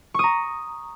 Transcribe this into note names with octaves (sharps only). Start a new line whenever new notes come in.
A#5 C#6 D#6